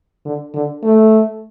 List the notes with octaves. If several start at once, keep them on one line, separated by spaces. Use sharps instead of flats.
D3
D3
A3